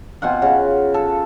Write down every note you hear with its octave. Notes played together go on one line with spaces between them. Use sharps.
B2 C4 F4 F#5
C#3
A4